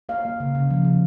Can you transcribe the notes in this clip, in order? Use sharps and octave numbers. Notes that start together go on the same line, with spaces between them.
A#3 F5
A#3
C#3
C#3
F3
C#3